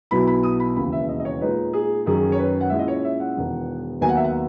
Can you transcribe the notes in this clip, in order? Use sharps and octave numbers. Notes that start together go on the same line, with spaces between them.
B1 B2 F#3 B3 E4 B5
B5
D#6
B5
E1 D#2 C#3 E3 B5
E5
D#5
D#5
C#5
A#2 G#3 D#4 B4
G#4
F#2 D#3 F#3 C#4 G#4
C#5
B4
F#5
A#2 G#3 C#4 E4 E5
D#5
C#5
E5
F#5
E1 E2 D#3
D#2 D#3 F#3 B3 D#4 G#5
F#5
E5
F#5